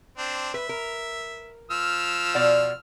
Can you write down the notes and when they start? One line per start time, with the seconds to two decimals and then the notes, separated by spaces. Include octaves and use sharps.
0.18 C4 D4
0.54 B4 E5
0.69 A#4
1.71 F3 E6 F6
2.34 B2 D5 F#5